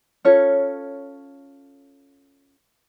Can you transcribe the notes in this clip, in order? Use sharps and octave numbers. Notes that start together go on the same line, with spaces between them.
C#4 F4 A4 C#5